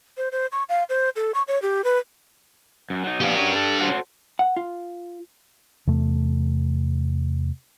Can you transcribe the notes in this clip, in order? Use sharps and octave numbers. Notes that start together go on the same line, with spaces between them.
C5
C5
C#6
F5
C5
A4
C#6
C#5
G4
B4
F#2
F#3 D#4
A#2 F3 B3 D4 G4
C#4 F#4 A#4
A4
F#4 A4 C5
F#5
F4
E2 C3 A3